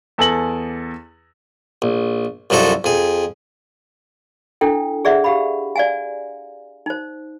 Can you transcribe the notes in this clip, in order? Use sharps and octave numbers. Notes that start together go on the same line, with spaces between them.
E2 A4 G#5 A#6 F#7
A#1
C2 F#2 F3 F#4 A4
F2 G#4
D4 E4 A4 G5
G#4 D5 E5 F#5
G4 F5 B5
D5 F5 G#5
D#4 C5